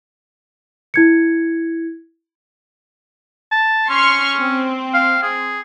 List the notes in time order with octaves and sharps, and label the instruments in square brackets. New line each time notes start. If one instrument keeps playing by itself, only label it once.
[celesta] E4 G#6 C#7
[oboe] A5
[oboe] C#4 [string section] C6 C#6 F6
[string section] C4
[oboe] F5
G#4